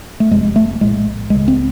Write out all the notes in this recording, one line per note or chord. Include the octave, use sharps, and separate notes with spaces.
A3
F1 F2 C3 G#3
A3
A#1 A2 G#3
C#2 C#3 G#3
C4